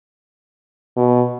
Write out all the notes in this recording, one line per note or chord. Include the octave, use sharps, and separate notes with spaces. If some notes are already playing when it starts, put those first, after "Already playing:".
B2